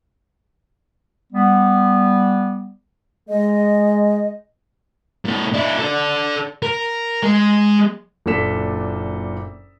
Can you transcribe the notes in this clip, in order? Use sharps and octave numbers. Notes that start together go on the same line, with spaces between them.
G3 B3
G#3 D#5
A#2 A4
D4 E4
A4 D5
A#4
G#3
F#1 A#2 D4 A4 B6 E7